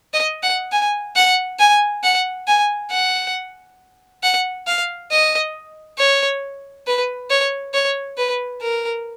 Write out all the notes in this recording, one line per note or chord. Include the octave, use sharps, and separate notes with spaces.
D#5
F#5
G#5
F#5
G#5
F#5
G#5
F#5
F#5
F5
D#5
C#5
B4
C#5
C#5
B4
A#4